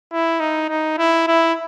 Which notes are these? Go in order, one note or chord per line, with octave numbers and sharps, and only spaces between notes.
E4
D#4
D#4
E4
E4